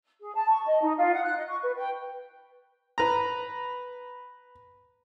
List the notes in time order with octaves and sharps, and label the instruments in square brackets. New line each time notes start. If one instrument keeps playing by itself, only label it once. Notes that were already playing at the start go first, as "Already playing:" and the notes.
[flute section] G#4
A5
C#6
D#5
D#4
F4
F#5
F#6
D#5
C#6
B4
G5
[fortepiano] B4 A#5